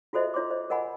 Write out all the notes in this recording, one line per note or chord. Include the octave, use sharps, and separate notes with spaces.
F4 F#4 A4 C5 D#5 E5
F4 C#5 C6 D6
C5 D#5
A#4 D#5 F#5 G#5 B5